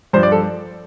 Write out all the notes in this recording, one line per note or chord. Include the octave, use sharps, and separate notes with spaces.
G2 F3 C5
D5
A4